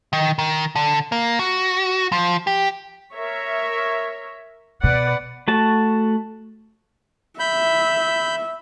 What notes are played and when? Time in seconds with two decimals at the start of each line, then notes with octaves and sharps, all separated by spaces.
0.13 D#3
0.39 D#3
0.76 D3
1.12 A#3
1.39 F#4
2.12 F3
2.47 G4
3.14 A#4 C#5 E5
4.84 B2 B4 D5 F#5
5.48 A3 F#4 A5
7.39 E5 B5 G6